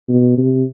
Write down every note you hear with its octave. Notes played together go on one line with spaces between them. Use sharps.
B2
C3